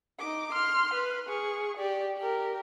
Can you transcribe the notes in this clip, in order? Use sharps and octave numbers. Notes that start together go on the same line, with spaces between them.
D#4 D6
C6 F6
B4
G#4 C#6
G4 D5
G4 A#4